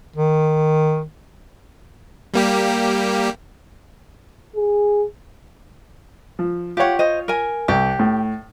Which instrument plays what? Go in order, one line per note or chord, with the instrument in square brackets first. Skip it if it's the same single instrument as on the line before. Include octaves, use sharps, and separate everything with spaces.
[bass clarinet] D#3
[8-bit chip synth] G3 A#3 G4
[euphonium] G#4
[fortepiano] F3
[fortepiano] F4 C#5 [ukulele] G4 F#5
[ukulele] C5 D#5
A#4 G#5
[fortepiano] C2 [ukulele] G4
[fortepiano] A2